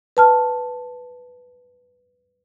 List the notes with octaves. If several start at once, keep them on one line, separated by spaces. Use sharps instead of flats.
B4 A5 F6